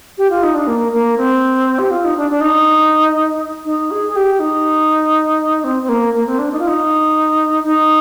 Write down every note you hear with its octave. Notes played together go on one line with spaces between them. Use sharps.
G4
F4
D#4
D4
A#3
A#3
C4
G4
F4
D#4
D4
D4
D#4
D#4
G#4
G#4
G4
D#4
C4
C4
A#3
A#3
C4
D4
D#4
F4
D#4
D#4